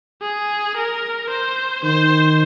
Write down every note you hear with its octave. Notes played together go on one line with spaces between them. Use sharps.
G#4
A#4
C5
D#3 C5